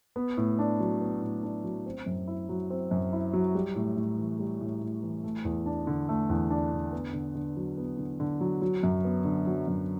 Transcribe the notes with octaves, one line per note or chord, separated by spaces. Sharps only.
B3
A2
D4
F#3
B3
A2
D4
F#3
C4
F#2
E4
F#3
C4
F#2
E4
F#3
G3
A2
A2
E3
G3
A2
A2
E3
A3
E2
D4
D3
A3
E2
D4
D3
B3
D3
D3
F#3
B3
D3
D3
F#3
F#3
F#2
B3
D3
F#3
F#2